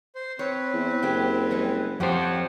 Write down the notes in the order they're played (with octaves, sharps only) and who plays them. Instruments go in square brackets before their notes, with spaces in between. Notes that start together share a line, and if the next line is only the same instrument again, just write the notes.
[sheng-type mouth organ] C5
[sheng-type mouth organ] C4 B4 [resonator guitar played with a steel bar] C#5
[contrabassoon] E2
[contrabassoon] F#1 [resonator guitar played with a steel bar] F#3 G4
[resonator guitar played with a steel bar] G3 G#3 B3
[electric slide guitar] F2 C5 [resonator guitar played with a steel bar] C#4 F#4 G4 [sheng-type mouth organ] F#5